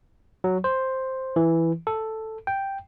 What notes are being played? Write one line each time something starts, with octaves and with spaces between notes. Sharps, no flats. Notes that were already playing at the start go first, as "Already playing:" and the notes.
F#3
C5
E3
A4
G5